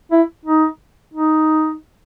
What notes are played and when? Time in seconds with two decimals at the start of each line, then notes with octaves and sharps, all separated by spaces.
0.12 E4
0.45 D#4
1.14 D#4